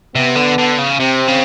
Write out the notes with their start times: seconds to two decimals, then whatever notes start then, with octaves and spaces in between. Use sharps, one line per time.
0.15 C3 B3
0.36 D3
0.58 D3
0.78 C#3
0.99 C3 C4
1.28 C#3